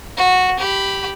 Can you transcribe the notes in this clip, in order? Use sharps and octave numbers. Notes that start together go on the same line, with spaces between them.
F#4
G4 B5